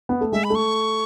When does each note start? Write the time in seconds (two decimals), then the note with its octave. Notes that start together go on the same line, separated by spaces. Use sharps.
0.09 B3
0.21 A3
0.32 G#3 E5
0.44 B5
0.50 A3 C#6